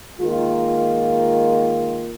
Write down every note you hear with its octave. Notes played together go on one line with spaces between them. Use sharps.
D#3 G#3 A#3 F4